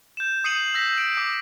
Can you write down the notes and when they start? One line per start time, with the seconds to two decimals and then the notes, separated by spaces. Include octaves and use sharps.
0.17 G6 E7
0.44 D#6 C7 C#7 D#7 F#7
0.74 E6 G6 A#6 B6
0.98 D7
1.17 D6 D#6 B6